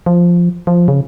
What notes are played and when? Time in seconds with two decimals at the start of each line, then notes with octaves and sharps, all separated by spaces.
0.06 F3
0.67 F3
0.88 C#3